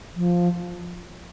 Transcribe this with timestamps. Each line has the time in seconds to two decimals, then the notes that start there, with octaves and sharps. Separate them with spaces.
0.15 F3